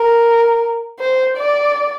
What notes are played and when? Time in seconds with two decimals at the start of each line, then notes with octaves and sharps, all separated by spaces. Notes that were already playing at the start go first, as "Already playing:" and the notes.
Already playing: A#4
1.00 C5
1.37 D5